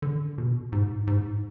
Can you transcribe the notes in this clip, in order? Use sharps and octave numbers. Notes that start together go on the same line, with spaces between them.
D3
B2
G#2
G#2